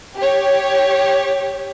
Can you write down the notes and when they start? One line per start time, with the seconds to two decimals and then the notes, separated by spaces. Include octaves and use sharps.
0.17 G4 C#5